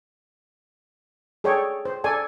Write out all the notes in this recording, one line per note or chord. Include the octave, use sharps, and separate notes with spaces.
G#4 A4 C#5 D5 G5
C5
A4 D5 G#5